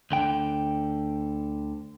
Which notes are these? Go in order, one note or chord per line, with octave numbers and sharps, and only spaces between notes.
D2 D3 G5